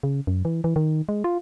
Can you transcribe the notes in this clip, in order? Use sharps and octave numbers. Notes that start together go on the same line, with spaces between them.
C#3
F#2
E3
E3
D#3
G#3
F4